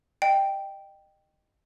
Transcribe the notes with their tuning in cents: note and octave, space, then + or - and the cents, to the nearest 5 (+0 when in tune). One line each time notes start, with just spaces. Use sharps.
D#5 -25 G5 +0